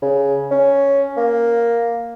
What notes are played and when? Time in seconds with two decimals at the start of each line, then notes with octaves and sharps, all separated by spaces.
0.02 C#3
0.51 C#4
1.17 A#3